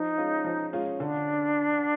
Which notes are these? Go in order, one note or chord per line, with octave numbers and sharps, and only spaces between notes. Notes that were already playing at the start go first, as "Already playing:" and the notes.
Already playing: F3 D#4
G#3 C#4 F4
F3
G#3 C#4 F4
D3 D4